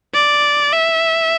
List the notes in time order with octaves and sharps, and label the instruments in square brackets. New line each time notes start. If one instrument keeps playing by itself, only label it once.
[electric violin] D5
E5